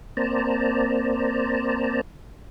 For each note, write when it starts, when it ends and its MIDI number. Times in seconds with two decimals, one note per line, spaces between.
0.17 2.01 58
0.17 2.01 60
0.17 2.01 72
0.17 2.01 74
0.17 2.01 81
0.17 2.01 82